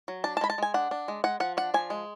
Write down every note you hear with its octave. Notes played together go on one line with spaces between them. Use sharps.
F#3
D4 A5
A5
G#3 B5
A5
G#3 G#5
D4 F#5
D4
G#3
G#3 F#5
F3 F#5
D4 F#5
F3 G#5
G#3